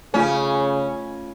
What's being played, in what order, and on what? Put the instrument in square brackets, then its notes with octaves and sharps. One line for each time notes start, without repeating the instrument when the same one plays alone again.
[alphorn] C#3 [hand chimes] A3 F4 [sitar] C#4